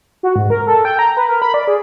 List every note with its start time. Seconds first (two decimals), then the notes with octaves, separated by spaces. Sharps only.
0.23 F#4
0.36 G#2
0.50 A#4
0.67 A4
0.85 G5
0.99 A#5
1.17 B4
1.29 A#4
1.42 B5
1.54 D5
1.67 G#4